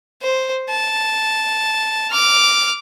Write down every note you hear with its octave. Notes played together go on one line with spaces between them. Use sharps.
C5
A5
D6 F6